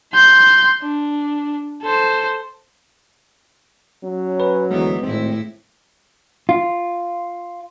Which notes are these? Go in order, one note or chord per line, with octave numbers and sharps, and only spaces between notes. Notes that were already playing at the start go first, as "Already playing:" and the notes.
C6 G6
D4
A4 C5
F#3 C#4
B4
D2 E3 G#3 B3
G#1 A2 C4 E4
F4